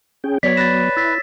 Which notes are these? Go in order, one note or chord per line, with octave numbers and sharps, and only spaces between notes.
C#4 G#4 G5
F#3 B3 C#5 D5 B6
B4 A6 A#6 E7
E4 E6 A6 B6